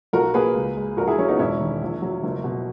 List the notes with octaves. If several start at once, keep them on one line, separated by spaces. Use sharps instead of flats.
B1 F#4 A#4
A#3 G#4 B4
C#2
G#3
A#1 F#4 A#4
E4 G#4
F#3 C#4
B3 D#4
E1 C#4 E4
D#3
A#1
F#3
F#1
B2